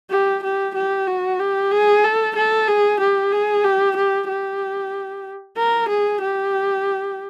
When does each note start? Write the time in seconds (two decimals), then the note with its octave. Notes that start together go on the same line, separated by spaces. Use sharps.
0.11 G4
0.43 G4
0.75 G4
1.07 F#4
1.39 G4
1.71 G#4
2.04 A4
2.36 A4
2.68 G#4
3.00 G4
3.32 G#4
3.64 G4
3.96 G4
4.28 G4
5.57 A#4
5.89 G#4
6.21 G4